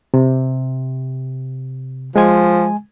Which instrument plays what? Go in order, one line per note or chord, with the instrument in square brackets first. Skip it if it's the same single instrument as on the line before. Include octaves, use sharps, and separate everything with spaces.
[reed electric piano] C3
[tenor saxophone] F3 [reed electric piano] G#3 G#5